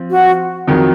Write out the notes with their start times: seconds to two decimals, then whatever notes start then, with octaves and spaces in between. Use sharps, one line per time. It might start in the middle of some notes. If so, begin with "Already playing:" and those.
Already playing: F3 C4
0.12 F#4
0.67 F2 D#3 F#3